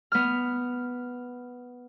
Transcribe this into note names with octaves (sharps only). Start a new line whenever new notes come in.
B3 F6